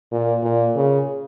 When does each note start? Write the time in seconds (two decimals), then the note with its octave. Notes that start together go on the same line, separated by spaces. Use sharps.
0.12 A#2
0.43 A#2
0.76 C#3